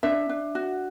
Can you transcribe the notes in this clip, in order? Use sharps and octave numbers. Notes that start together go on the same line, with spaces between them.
D4 E5
D4
F#4